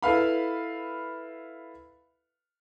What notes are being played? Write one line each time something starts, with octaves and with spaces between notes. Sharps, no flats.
E4 A4 B4 F5 B5